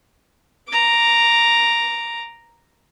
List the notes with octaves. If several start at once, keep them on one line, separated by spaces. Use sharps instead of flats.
A#5 D6